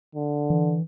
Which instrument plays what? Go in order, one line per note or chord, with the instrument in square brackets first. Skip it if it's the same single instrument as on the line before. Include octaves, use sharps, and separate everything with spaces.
[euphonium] D3
[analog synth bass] E3